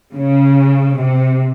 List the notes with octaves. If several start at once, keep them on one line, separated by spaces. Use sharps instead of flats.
C#3
C3